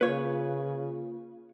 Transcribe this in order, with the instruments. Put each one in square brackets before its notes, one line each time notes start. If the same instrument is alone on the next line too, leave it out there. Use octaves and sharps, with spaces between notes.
[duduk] C#3 [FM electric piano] A#3 F4 [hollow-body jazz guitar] B4 C#5